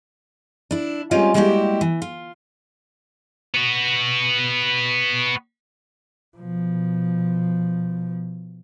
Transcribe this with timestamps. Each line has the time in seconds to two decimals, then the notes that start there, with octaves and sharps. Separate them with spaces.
0.71 D4 E4
1.11 G3 G#3 C4 C#4 F4 C#5
1.34 G3 G#3 A#3 E4 F#4 G4
1.81 E3
2.02 F4
3.54 B3 F#4
6.37 B2 F3